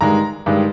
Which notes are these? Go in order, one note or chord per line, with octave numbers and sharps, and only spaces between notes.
G2 D#3 G#3 A#5
G2 D#3 G#3